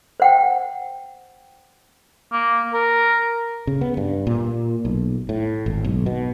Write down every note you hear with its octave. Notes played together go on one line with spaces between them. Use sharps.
C5 F#5 G5
A#3
A#4
C#3
B3
G2
A#2
B1
A2
G#1
B1
B2